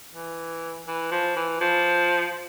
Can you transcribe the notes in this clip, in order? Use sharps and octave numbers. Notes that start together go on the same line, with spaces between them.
E3
E3
F3
E3
F3